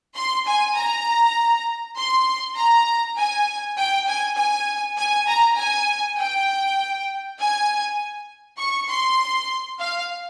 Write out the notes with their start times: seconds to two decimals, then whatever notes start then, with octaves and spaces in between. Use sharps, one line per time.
0.15 C6
0.46 G#5
0.75 A#5
1.96 C6
2.56 A#5
3.16 G#5
3.77 G5
4.07 G#5
4.37 G#5
4.97 G#5
5.27 A#5
5.57 G#5
6.18 G5
7.38 G#5
8.58 C#6
8.88 C6
9.79 F5